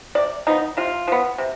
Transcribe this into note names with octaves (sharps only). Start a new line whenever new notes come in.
C3 D5
F3 B3 D#4
C3 F4
F3 B3
C3